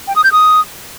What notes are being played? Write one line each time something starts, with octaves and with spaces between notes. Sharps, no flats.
G5
D#6
G6
D#6